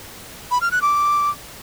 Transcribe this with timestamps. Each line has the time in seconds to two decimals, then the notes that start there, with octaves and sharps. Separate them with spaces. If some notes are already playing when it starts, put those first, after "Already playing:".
0.51 B5
0.61 F6
0.72 F#6
0.82 D6